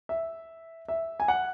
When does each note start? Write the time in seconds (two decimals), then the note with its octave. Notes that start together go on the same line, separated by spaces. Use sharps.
0.09 E5
0.88 E5
1.20 G#5
1.28 F#5